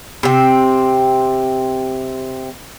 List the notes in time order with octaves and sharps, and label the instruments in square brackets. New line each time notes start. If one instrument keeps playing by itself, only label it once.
[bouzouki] C3 C4